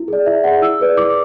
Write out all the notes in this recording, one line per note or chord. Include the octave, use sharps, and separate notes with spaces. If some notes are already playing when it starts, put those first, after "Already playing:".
Already playing: E4
G#4 D5
E4 E5
G#4 D5 F#5
E4 E6
G#4 B4 D5
E4 D6